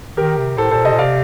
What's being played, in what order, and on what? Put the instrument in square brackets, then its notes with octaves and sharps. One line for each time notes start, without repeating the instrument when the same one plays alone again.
[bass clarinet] D#3 [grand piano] G4 A#4
[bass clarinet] C3
[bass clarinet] A2 [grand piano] A4 C5
[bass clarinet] A#2 [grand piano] A4 C5
[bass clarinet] C3 [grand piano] C5 D#5
[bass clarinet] A#2
[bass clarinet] C3 [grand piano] D5 F5